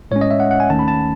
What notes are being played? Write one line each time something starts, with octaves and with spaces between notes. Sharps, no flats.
A2 G#3 C#4 C#5
D#5
E5
F#5
F#5
G#5
D#2 D#3 A3 C#4 A5
B5
A5